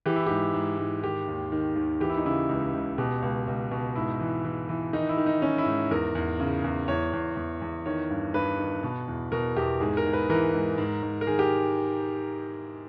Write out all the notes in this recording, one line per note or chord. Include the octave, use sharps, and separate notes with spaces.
E3 G4
E4
G#2 G4
G#2
G#2
D#3 G4
D#2
D#3
D#2
E3 G4
E4
D#4
C#3 E4
C#2
C#2
B2 G4
C#2
C#2
B2
G#2 E4
E3
E3
E3
D#3 D#4
E4
D#3
D#4
D#3 C#4
E4
G#2
E2 A#4
E2
C#3
E2
E2 C#5
E2
E2
E2
D#3 C#5
G2
G2 B4
D#3
B2
E2
B2 A#4
E2 G4
G#2 G#4
A#4
G#2
B4
E3 A#4
G#2
G#2
G#2
A#4
D#3 G#4
G4